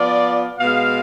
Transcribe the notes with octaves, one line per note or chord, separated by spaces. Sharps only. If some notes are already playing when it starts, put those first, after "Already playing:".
Already playing: F3 B3 F4 D5
B2 G#3 B3 F5